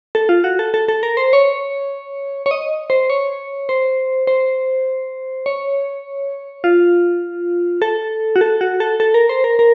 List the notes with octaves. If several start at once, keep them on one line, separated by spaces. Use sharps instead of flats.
A4
F4
F#4
A4
A4
A4
A#4
C5
C#5
C#5
D#5
C5
C#5
C5
C5
C#5
F4
A4
F#4
A4
F#4
A4
A4
A#4
C5
A#4
A#4